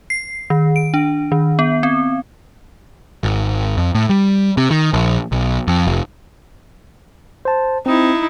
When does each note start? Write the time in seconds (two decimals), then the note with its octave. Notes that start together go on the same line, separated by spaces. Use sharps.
0.10 C7
0.50 D#3
0.76 D7
0.94 D4
1.32 D#3
1.59 B3
1.83 C4
3.23 G#1
3.77 F2
3.95 A2
4.09 G3
4.57 C3
4.71 D#3
4.93 A#1
5.32 B1
5.68 F2
5.87 F1
7.45 C5 A5
7.86 C4 D#4 E4